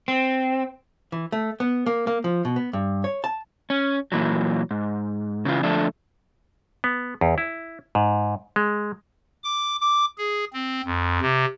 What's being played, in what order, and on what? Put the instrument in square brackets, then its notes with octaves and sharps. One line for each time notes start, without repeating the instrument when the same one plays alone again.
[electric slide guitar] C4
[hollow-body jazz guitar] E3
A3
B3
A#3
A#3
F3
B2
B3
G2
C#5
A5
[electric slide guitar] C#4
A#2 E3 F#3
G#2
C#3 E3 F4
D3 F3 A3 D4
[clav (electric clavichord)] B3
E2
E4
G#2
G#3
[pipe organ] D6
D6
G#4
C4
F2
C3